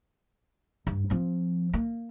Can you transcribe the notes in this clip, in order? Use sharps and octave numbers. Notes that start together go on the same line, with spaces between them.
G2
F3 C4
A#3